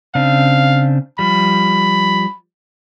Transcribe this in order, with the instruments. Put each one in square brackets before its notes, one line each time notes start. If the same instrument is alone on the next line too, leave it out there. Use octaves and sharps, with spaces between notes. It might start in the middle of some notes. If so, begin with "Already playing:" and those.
[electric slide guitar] C#3 C4 D4 [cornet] F5
[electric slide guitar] F3 G3 [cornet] B5